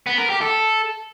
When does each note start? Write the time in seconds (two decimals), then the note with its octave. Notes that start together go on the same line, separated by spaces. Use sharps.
0.07 B3
0.18 A#4
0.30 G4
0.41 A4